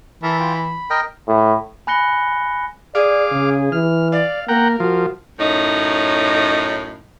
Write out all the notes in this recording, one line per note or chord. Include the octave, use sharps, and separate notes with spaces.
E3 A#4 E5 A5
F4 G5
B5
A#4 D#5 G5
A2
G#5 B5 F#6 A#6 C#7 G7
G#4 D5 F5 D6
C#3
E3 F6
D5 F5
A#3 A#4 F#5 G5 A#5
F3 F#4
F#2 A2 D#4